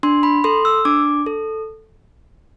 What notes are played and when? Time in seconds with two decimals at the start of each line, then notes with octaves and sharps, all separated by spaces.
0.03 D4 C6
0.23 B5
0.44 A4 C6
0.65 E6
0.85 D4 D6
1.26 A4